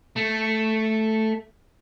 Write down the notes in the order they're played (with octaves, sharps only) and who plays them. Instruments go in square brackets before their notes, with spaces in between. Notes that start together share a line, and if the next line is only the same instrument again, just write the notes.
[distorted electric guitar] A3